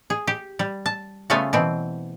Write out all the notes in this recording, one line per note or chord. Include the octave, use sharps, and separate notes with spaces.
G#4
G4
G3
A5
C#3 G3 A3 B3 F4 G#5
B2 E3 C4